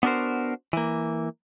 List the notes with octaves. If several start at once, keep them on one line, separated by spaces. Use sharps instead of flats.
B3 D4 F#4 A#4 C5
E3 A#3